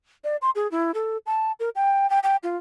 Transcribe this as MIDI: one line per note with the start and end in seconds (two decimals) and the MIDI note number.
0.24 0.36 74
0.42 0.50 84
0.55 0.70 68
0.71 0.92 64
0.94 1.18 69
1.26 1.52 81
1.60 1.69 70
1.75 2.09 79
2.10 2.19 79
2.23 2.36 79
2.43 2.57 65